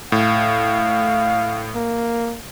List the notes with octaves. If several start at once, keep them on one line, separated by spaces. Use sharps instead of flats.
A2 F5
A#3